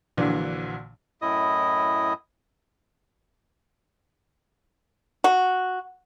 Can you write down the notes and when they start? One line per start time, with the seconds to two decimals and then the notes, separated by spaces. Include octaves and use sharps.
0.17 A#1 A#2 D3 E3 F#3
1.22 F#2 A2 E4 D#5 D#6
5.24 F#4